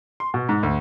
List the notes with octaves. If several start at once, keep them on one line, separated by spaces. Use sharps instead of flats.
C6
B2
G#2
D2